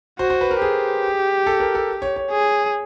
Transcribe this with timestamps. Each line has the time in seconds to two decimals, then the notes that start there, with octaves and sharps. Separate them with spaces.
0.19 F#4 C5
0.30 C5
0.41 B4
0.51 A#4
0.62 G4 G#4
1.47 A4
1.60 A#4
1.75 A4
2.02 C#5
2.16 C#5
2.31 G#4